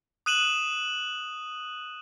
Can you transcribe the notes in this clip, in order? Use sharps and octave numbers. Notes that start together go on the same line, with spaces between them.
D#6 F#6 D#7 E7 F#7